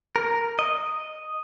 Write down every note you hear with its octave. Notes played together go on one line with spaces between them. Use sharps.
A#4
D#5